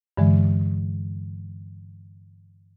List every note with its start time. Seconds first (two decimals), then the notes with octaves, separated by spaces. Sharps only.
0.17 G2 D3 E3 G#3